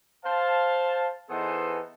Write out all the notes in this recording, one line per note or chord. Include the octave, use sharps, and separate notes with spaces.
C5 F5 A5
E3 B3 D#4 G#4 A4 C5